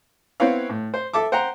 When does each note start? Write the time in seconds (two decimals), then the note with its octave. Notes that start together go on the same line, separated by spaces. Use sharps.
0.40 B3 C4 E4 B4 C#5 F5
0.69 A2
0.94 C5
1.13 A4 E5 A5 D6
1.32 C5 F#5 G5 A#5